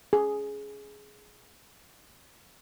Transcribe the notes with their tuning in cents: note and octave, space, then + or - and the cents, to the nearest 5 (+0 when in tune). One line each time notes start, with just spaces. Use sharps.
G#4 +10